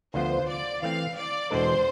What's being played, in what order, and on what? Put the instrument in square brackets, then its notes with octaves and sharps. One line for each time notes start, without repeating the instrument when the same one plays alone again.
[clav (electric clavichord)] D2 D3 F3 B3 F4 [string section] C5
[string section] D5
[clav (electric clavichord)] E3 A3 C4 [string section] F5
[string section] D5
[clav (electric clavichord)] E2 B2 G#3 D4 A4 [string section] C5